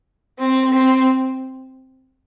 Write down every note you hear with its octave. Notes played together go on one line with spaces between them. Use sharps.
C4
C4